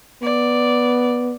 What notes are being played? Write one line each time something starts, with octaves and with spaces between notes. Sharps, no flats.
B3 D5